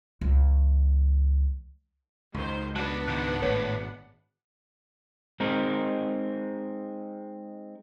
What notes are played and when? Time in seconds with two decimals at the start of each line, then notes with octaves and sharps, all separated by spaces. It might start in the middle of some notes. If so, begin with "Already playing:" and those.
0.21 C#2 E3
2.34 C#2 F#2 D#3 C5
2.76 F#3 B3 D4 B4 F#5 A5 F#6
3.08 G#2 D#3 F#6
3.42 G#1 A2 B4 C#5
5.40 G#3 C4 D#4 A#4